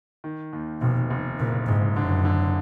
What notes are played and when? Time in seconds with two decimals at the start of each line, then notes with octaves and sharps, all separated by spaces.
0.24 D#3
0.53 D#2
0.81 F1 B2
1.10 F1
1.39 F#1 A#2
1.68 F#1 G#2
1.96 F#2 D3
2.25 D3